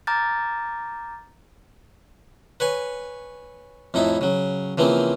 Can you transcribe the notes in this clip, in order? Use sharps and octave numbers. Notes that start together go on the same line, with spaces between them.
A#5 D6 F6 G6 A6
B4 C#5 G#5
F2 A2 D#4 E4
C#3 F#3
C#3 E3 F3 A#3 C4